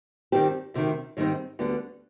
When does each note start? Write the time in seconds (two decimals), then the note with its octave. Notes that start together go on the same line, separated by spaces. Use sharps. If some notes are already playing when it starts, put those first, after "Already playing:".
0.32 G2 D#3 G3 C4 G4
0.74 D2 C3 D#3
1.17 G#2 D#3 G3 C4 D#4
1.59 D2 D3 G3 B3